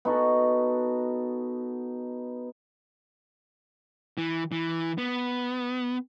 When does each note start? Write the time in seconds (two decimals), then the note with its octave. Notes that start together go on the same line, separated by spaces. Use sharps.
0.05 B3 D#4 F#4 A4
4.18 E3
4.52 E3
4.98 B3